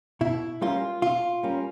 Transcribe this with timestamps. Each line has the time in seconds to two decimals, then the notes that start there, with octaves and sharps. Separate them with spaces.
0.21 B2 E4
0.61 G3 A#3 C#4 F4
1.02 B2 F4
1.43 G3 A#3 C#4